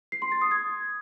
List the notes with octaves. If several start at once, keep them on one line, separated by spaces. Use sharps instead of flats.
C7
C6
A6
D#6
G#6